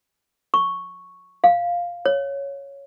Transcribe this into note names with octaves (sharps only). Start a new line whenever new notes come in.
C#6
F5
C#5